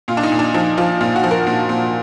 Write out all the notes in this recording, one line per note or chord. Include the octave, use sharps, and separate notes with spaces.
A#2 F4
D4
D#4
A#2
D4
F3 D#4
F3 F4
A#2 F4
F#4
F3
A#4
A#2
A#2